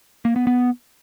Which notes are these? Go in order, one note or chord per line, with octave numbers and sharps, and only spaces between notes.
A#3
B3
B3